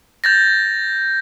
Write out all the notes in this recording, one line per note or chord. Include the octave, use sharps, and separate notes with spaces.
G6 A6 A#6